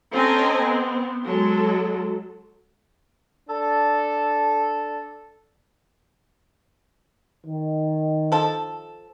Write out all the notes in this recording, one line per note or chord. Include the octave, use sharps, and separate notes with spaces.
C4 C#4 A4 D#5 G#5 A#5
B3 C4
F#3 G#3 A4
D4 A4
D#3
F3 A4